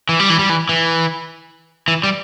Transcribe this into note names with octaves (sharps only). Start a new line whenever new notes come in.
E3
G3
E3
G3
E3
E3
E3
G3